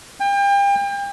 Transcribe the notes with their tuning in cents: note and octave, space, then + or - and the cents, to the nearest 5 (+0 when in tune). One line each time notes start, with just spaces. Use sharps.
G5 +35